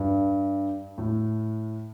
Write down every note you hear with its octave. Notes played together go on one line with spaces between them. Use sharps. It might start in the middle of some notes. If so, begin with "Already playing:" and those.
Already playing: G2
A2